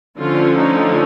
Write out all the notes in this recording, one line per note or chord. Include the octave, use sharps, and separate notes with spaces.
D3 F3 A3 C#4 F4
D#4